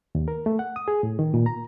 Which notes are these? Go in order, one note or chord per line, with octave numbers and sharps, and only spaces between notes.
D#2
A#4
A3
F#5
D#6
G#4
A2
D#3
A#2
A#5